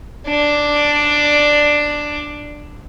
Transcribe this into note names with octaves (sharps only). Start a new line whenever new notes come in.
D4 D5